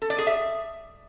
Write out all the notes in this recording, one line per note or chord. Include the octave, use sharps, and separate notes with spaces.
A4
D5
G#4
E5